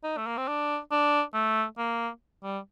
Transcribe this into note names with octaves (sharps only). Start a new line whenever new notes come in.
D#4
A3
A#3
C4
D4
D4
A3
A#3
G3